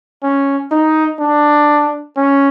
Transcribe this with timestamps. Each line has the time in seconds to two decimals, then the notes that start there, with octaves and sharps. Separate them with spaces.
0.23 C#4
0.71 D#4
1.20 D4
2.17 C#4